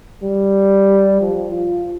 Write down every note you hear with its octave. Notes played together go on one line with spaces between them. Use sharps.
G3
F3
F4